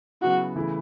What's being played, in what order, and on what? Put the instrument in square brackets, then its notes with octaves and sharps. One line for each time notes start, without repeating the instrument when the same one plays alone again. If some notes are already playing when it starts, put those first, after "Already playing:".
[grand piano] C#3 F#3 B3 E4 [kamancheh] F#4
[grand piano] C#3 E3 A3 E4